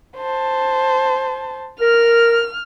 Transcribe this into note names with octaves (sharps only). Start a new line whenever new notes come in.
C5 A5
A#4 F6